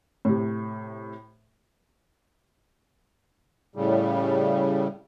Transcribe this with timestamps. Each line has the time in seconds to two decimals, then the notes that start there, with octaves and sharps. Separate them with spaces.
0.25 A2 C3
3.76 A2 C#3 G3